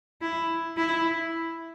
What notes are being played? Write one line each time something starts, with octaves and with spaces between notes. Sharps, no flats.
E4
E4